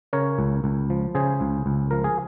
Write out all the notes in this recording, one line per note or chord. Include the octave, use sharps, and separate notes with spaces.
C#3 A#4 C#5
C#2
C#2
F3
C#3 G#4 C5
C#2
C#2
F3 A#4
G#4